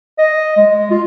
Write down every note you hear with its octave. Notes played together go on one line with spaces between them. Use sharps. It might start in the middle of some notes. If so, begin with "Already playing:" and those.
D#5
G#3
F4